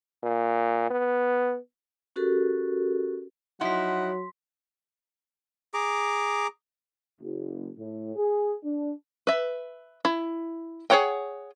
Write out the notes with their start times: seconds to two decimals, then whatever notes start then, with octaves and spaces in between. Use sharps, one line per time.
0.23 A#2
0.91 B3
2.16 C#4 F#4 G4 A4 A#4
3.61 F3 F#3 D#4 E4 F#5 C6 B6
5.74 G#4 A#5 D6
7.20 F#1
7.78 A2
8.16 G#4
8.63 D4
9.27 B4 E5
10.05 E4
10.90 G#4 C5 C#5 F#5 G5